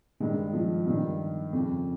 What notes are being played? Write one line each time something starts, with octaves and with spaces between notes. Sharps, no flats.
G2 D#3 G#3
F3
G2 D#3
F2 C#3